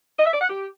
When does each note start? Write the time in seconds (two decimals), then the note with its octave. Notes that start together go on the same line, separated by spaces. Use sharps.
0.18 D#5
0.26 E5
0.33 D5
0.41 F#5
0.49 G4